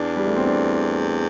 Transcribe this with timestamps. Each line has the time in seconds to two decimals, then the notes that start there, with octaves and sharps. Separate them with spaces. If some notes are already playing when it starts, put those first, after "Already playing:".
Already playing: E2 D4
0.16 G3
0.27 A3
0.37 C4
0.46 D4